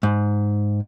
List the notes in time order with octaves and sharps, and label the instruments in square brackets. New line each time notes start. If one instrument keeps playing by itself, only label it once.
[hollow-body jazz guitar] G#2